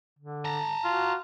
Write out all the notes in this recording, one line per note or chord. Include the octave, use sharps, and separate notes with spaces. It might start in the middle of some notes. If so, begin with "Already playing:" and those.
D3
A5 A#5
F4 F#4